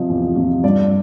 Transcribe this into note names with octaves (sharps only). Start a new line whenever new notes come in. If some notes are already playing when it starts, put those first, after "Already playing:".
Already playing: C3 F3 D#5
E2
C3 F3
G2 D5